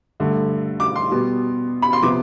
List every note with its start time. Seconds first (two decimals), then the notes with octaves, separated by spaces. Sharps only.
0.20 G2 D3 A3
0.80 D6
0.96 C6
1.11 B2 G3 B3
1.82 B5
1.93 C6
2.03 C3 F3 B3 D6